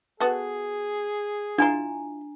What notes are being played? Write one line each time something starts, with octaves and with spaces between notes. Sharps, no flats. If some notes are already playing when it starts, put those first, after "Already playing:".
B3 F#4 G#4 A4
D4 E4 F4 G#5 A#5